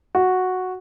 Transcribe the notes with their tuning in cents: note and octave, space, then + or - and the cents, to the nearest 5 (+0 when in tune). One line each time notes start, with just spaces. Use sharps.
F#4 -5